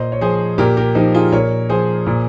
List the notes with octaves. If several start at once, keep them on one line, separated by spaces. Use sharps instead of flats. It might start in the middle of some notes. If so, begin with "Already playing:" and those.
Already playing: A#2 C5 D#5
C#5
F3 G#4 C5
A#2 G4 A#4
G4 A#4
F3 D#4 G4
F4 G#4
A#2 A#4 C#5
F3 G#4 C5
A#2